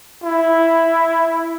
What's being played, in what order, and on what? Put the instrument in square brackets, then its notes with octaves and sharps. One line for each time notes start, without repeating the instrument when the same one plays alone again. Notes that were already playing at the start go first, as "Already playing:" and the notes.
[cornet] E4